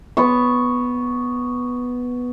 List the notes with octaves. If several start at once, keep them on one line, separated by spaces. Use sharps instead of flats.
B3 C#6